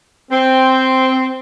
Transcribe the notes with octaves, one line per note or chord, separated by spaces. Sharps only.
C4